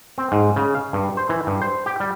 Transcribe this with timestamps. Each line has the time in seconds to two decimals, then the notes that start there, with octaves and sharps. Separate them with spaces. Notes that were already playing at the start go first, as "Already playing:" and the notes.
0.18 C4
0.32 G#2
0.56 C#3
0.75 F5
0.93 G2
1.17 C5
1.29 E3
1.47 G2
1.62 C5
1.86 G4
2.00 G3